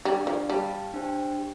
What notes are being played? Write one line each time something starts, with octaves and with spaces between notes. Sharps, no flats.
G3 D4 G4 D5
F3
G3 G4 F5 A5
D4 G4 C5 G5
G4